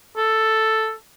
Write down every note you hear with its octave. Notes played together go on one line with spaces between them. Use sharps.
A4